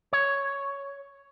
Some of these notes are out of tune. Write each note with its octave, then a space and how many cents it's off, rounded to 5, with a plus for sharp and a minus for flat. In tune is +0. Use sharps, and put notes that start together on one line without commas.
C#5 +5